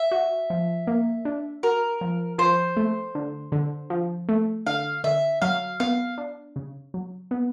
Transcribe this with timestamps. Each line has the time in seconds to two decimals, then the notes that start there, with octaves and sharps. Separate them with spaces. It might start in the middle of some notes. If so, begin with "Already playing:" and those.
Already playing: E5
0.11 F#4
0.50 F3
0.87 A#3
1.25 D4
1.63 F#4 A#4
2.01 F3
2.38 F3 C5
2.77 A3
3.15 D3
3.52 D3
3.90 F3
4.29 A3
4.67 D3 F5
5.04 D3 E5
5.42 F#3 F5
5.80 B3 F5
6.18 D4
6.56 C#3
6.94 F#3
7.31 B3